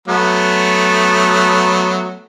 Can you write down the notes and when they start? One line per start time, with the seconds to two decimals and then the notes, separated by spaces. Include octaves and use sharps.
0.08 F#3 A3 B3